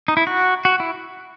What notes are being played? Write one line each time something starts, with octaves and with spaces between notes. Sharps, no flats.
D#4
E4
F#4
F#4
E4